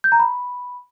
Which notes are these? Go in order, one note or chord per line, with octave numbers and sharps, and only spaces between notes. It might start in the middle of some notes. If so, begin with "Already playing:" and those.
G6
A#5
B5